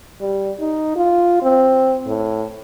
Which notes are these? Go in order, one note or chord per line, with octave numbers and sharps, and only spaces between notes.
G3
D#4
F4
C4
A2